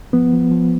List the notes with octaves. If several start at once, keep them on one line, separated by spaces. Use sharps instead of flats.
F3 B3
F3
F3